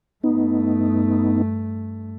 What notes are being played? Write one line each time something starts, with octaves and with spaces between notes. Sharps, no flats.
G2 A3 B3 D#4